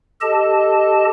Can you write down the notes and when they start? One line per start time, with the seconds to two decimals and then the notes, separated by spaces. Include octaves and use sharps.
0.21 G4 A4 D#5 A5